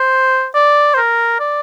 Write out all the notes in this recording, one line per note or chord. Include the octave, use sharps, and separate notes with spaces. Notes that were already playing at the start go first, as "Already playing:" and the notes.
Already playing: C5
D5
C5
A#4
D5